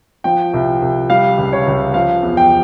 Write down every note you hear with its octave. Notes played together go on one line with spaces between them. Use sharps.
F3 G5
C2
C2
G3 F5
C#2
C#5
C#2
F3 F5
E2
G5